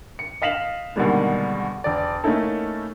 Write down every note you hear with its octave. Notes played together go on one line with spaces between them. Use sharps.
C#7
D#5 F5 B6 E7 F#7
B2 D3 D#3 G3 G#3 A#3
E1 D5
A3 A#3 C#4 D#4 E4 A4